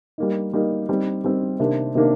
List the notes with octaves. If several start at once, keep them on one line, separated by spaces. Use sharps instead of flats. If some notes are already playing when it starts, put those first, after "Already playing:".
G3 A#3 D#4
G3 A#3 D#4
G3 C4 D#4
G3 C4 D#4
C3 D#3 A#3 D4
C3 D#3 A#3 D4